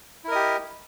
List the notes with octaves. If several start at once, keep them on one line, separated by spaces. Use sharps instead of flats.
E4 G4 A#4 D#5